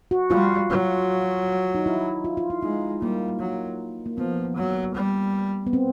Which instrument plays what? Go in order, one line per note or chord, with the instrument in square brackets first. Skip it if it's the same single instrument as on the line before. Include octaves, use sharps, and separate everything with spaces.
[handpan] F#4
[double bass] G3 [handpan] F4
[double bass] F#3
[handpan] D#4
E4
F4
F4
E4
[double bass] G#3 [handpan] D#4
[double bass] G3 [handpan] A#3
[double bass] F#3
[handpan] A#3
[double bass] F3 [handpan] B3
[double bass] F#3
G3
[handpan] B3
C4